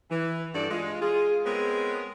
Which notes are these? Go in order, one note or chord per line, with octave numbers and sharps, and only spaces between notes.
E3
G2 F#4 A4 D5
G#3 F4
F4 G#4
G#3 B3 C4 G#4 A#4 C#5